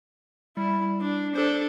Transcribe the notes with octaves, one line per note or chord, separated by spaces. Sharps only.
G3 E4
D4
D4 A4 C5